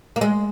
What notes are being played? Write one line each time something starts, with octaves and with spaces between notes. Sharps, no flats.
A#3
G#3